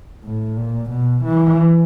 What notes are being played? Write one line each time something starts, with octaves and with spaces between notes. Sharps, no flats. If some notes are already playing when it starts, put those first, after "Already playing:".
A2
A#2
B2
E3